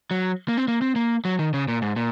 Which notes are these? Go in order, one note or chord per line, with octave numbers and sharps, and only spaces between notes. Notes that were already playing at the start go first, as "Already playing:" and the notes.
F#3
A#3
C4
A#3
C4
A#3
F#3
D#3
C#3
A#2
G#2
A#2